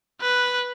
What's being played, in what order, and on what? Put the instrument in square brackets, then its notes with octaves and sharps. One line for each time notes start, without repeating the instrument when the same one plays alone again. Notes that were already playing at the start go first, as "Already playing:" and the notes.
[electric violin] B4